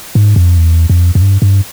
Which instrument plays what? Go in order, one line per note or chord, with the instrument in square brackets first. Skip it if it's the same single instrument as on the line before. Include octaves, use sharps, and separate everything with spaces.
[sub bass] G#2
F2
E2
F2
F2
G2
G2